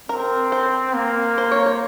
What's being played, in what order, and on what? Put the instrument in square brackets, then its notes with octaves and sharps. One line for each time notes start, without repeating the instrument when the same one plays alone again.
[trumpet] C4 [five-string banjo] A#4
[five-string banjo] C5
[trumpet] A#3
[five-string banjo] C5
C#5
C5